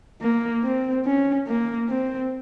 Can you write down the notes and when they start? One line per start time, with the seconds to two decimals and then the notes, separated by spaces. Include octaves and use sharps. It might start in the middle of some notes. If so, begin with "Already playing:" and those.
0.22 A#3
0.64 C4
1.05 C#4
1.47 A#3
1.89 C4